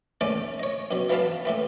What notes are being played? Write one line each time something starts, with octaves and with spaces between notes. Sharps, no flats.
A1 D#2 A3 C#4 A4 D5
C#5 D#5
F#2 B2
E3 F#3 B3 E5 F5 A5
A2 E3 B3